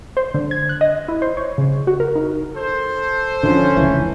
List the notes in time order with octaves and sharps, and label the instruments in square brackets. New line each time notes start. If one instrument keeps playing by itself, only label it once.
[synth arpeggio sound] C5
D3
G#6
F#6
D#5
E4
C5
C#5
C#3
F#4
A#4
D#4
[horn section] A4 C5
[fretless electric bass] D3 E3 F3 [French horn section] C#4
[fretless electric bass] F1 C#2 E3